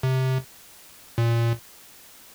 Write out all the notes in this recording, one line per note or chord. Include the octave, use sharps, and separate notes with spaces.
C3
A#2